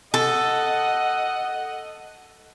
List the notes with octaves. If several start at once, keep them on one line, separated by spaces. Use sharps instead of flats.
A4 D#5 F#5